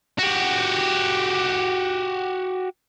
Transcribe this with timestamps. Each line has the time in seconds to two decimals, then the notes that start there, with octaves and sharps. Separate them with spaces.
0.19 F#4 G4